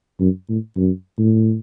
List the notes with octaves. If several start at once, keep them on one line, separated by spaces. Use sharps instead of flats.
F#2
A2
F#2
A2